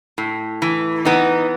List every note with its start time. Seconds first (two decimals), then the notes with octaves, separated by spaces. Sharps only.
0.18 A2
0.62 E3
1.05 E3 B3 D#4